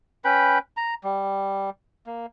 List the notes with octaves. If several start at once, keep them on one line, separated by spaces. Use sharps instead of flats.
C#4 B4 G5 B5
A#5
G3
A#3